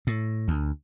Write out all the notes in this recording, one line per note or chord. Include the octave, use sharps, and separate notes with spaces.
A2
D2